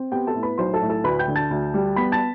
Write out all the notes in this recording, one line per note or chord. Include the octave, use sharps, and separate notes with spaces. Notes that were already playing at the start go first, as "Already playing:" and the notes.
Already playing: C4
B3 G4 G5
A4 A5
A2
B4 B5
B1 C5 C6
A4 A5
A2
A4 A5
D2 B4 B5
G5 G6
D3
A5 A6
D2
G3
B3 B5 B6
A5 A6